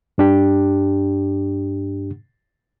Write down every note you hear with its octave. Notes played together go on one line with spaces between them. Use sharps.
G2 D4 G4